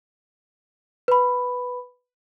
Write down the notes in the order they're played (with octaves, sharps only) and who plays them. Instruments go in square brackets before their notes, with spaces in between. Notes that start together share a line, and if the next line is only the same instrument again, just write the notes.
[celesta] B4 B5